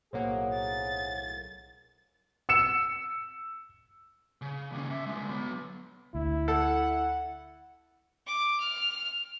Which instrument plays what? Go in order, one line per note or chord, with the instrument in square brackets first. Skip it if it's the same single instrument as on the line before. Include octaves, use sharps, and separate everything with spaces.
[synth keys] B1 A2 A#3 [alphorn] G#4 [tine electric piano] C5 C#5 F#5
[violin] A6
[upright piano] E6 C#7 E7
[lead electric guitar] C#3
D#2 C#4
C#3 E5
D3 G#3
F#3 B3
[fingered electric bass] D2 [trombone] E4
[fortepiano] A4 [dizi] F#5
[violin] D6
F6